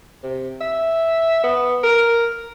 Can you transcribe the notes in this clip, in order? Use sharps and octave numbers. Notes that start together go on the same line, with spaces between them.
C3
E5
B3
A#4